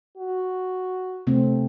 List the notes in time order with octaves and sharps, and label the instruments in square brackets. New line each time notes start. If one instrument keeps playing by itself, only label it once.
[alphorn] F#4
[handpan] C3 A3 C4